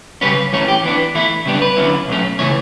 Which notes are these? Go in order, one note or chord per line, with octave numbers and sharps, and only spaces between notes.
C#3 G3 C#4 B4
E3 A3 C#4 C#5
G4
E3 B3 D4
E3 A3 E4
C#3 G3 B3 D4
B4
D3 F#3 C#4 E4
B2 F#3 A3 C#4
C#3 E3 A3 C#5